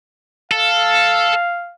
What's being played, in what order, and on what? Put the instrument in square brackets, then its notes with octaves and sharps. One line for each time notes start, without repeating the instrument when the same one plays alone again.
[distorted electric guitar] A4 [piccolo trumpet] F5